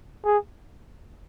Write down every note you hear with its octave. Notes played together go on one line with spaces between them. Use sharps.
G#4